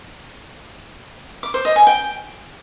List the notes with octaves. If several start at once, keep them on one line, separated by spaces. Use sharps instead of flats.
D6
C5
D#5
G#5
G5